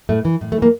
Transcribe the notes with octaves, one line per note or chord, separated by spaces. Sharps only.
A2 A3
E3
A2
A3
E3
A#3